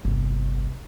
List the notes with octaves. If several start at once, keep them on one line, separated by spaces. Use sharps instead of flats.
G1 C2